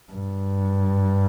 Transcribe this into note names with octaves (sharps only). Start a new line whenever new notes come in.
G2